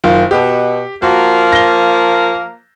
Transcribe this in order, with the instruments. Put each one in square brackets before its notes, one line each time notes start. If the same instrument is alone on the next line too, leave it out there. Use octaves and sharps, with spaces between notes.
[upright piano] F#1 D#3 F4
[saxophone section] B2 [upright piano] G4
[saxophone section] F3 A#3 [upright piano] F#4
[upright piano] A#6 G7